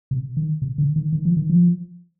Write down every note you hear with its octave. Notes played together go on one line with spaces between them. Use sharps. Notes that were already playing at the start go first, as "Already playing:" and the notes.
C3
D#3
C3
D3
D#3
D#3
F3
D#3
F3